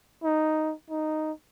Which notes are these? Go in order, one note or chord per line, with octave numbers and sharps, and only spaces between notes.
D#4
D#4